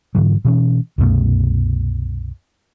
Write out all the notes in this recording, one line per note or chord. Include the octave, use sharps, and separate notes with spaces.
G#2 D3 E3 F#3
B2 E3 C#4
C2 F#2 B2 A3